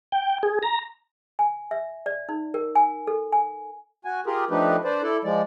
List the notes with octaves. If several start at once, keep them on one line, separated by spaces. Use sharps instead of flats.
G5
G#4
A#5
G#5
E5
D5
D#4
A#4
G#5
A4
G#5
F#4 G#5
F4 G4 G#4 A#4
F3 A3 D4 D#4 G4 B4
D4 B4 C5 D5
E4 A4 D5
F3 G#3 D5